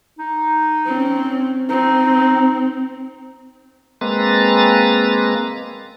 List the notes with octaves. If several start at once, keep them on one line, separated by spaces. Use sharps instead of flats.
D#4
C4 C#4
C4 D#4
G#3 A#3 C4 B4 A#5 A6